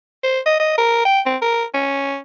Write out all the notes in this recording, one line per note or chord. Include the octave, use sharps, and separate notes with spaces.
C5
D#5
D#5
A#4
G5
C4
A#4
C#4